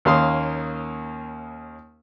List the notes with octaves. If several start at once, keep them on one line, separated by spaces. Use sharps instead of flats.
D#2 A#3 C#4 F5 C6 D#6